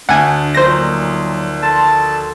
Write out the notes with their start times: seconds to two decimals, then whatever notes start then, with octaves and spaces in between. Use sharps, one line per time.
0.09 D2 D4 F#5 G#5
0.55 A#2 D#3 F3 F#3 C5 A#6
1.63 A4 A5 C6